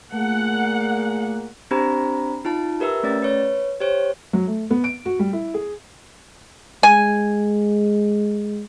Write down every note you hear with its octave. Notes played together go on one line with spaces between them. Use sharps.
A#2 A3 A#3 G#4 F#5
C4 D4 G4 C5 A#5 B5
D#4 F4 A5
G4 A#4 B4 E5 E6
A3 C#4 D5 A6
B4 C#5
G4 C5 C#5
F#3
A3
B3
D7
F#4
G3
E4
G#4
G#3 G#5